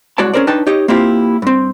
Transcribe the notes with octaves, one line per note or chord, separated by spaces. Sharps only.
C2 G#3 F#4 C#5 D5 A5
C#4 G#4 A#4 C5 D5
D4 D#4 B4 C#5 G5 A5
D#4 G4 C#5 D#5
A#3 C4 E4 F4 G4
G2 C4